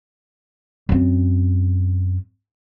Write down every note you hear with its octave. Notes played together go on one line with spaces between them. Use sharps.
F#2 C4